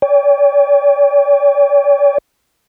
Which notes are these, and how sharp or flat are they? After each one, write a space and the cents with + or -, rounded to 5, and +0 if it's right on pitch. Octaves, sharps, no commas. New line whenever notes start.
C#5 +45 G5 +40